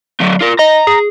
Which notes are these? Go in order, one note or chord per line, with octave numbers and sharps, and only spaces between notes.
F#3 A3
F4 A#4
D#5 A#5
G#4